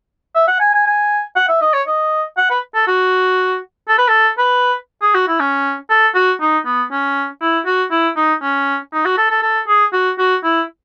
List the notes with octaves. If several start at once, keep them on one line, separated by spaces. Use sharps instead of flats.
E5
F#5
G#5
G#5
G#5
F#5
E5
D#5
C#5
D#5
F#5
B4
A4
F#4
A4
B4
A4
B4
G#4
F#4
E4
C#4
A4
F#4
D#4
B3
C#4
E4
F#4
E4
D#4
C#4
D#4
F#4
A4
A4
A4
G#4
F#4
F#4
E4